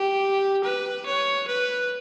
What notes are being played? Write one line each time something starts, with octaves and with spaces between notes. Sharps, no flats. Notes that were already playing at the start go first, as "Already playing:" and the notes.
Already playing: G4
B4
C#5
B4